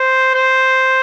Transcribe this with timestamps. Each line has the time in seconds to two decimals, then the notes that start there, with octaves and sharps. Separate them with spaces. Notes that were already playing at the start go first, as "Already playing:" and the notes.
Already playing: C5
0.34 C5